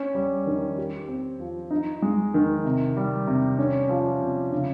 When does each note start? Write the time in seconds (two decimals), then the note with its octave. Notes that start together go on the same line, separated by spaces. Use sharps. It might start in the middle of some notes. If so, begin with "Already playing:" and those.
Already playing: C#4
0.15 G3
0.47 D#3
0.78 G4
1.08 C4
1.40 F3
1.71 D#4
2.02 G#3
2.34 D#3
2.65 C3
2.97 G3
3.27 C3
3.58 C#4
3.89 F3
4.21 C3
4.52 C#3